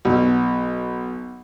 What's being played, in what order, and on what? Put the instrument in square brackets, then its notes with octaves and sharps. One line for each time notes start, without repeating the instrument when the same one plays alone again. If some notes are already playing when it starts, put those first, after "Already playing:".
[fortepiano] B1